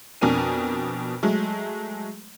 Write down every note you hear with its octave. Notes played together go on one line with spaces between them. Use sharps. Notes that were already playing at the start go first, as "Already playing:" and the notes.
F2 B2 D4 A#4 G#5 D#7
F#3 G#3 A3